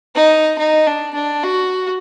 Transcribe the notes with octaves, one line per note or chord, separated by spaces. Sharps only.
D#4
D#4
D4
D4
F#4